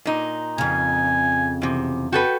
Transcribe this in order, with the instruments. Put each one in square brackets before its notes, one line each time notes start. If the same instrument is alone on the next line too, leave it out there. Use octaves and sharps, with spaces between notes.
[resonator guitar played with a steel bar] A#2 D#4
[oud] F2 C#3 [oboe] G#5
[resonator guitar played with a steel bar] E2 C3
[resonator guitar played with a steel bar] F#4 A4 B4 [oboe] G5